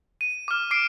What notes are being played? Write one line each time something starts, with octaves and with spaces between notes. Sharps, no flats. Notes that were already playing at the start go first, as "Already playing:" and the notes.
D#7
D6 F6
D6 C7 D7